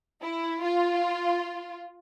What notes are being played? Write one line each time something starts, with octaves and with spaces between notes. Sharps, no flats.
E4
F4